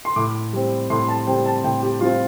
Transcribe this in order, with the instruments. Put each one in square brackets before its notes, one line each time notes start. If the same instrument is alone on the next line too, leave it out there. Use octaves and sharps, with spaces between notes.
[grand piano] C6
A2 D6
G3 C4
A2 C6
A5
G3 C4 G5
A5
A2 G5
G4
G3 C4 F4